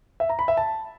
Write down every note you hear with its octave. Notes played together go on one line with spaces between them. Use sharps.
E5
A#5
B5
E5
A5